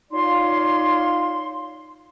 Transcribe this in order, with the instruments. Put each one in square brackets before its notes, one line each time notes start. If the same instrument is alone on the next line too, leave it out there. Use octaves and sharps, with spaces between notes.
[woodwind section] D#4 F4 C#5 D5 F5 C6